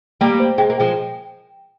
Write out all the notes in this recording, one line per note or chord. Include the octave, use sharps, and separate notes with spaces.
G3 A#3 G5
C5
G#3 G5
A#3
F3 G#3 G5